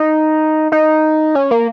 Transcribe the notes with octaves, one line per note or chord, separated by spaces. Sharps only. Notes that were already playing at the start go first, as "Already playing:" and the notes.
Already playing: D#4
D#4
C#4
A#3